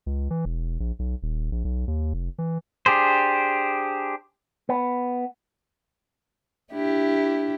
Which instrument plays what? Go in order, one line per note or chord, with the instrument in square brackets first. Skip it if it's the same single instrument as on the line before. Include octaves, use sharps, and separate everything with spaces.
[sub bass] C#2
E3
E1
A#1
B1
D#1
A#1
B1
D#2
F1
E3
[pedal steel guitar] D4 G4 G#4 C5
[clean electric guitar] B3
[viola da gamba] D4 E4 G4